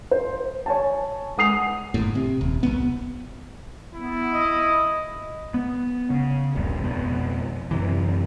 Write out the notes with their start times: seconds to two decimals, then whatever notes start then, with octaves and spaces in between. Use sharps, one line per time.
0.11 C5
0.66 C#5 G#5 A5
1.37 G#3 F#5 D#6 C7 F7
1.94 G1 A2
2.15 C3
2.41 D#1
2.63 C2 F2 B3
3.95 B3 E4
4.34 D#5
5.54 B3
6.10 C#3
6.55 D#1 A#1 G2
6.80 F2 B2
7.71 F#2 C3 E3